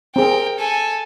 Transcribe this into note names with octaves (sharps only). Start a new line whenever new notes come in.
C4 G#4 A#4 G5
A4 G#5